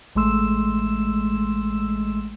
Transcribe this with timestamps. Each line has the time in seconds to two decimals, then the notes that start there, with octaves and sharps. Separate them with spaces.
0.15 A1 G#3 A3 C6 E6 E7